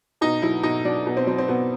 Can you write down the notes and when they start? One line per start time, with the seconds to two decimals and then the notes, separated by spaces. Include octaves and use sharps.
0.21 B2 D#4
0.42 F#3 E4
0.63 B2 D#4
0.85 F#3 D4
1.06 B2
1.17 C4
1.27 F#3 C4
1.38 C4
1.48 B2 B3